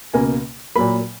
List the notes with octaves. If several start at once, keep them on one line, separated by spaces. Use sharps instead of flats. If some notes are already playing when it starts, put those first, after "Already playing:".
C#2 B2 A#3 G#5
A#2 F#3 A#3 B5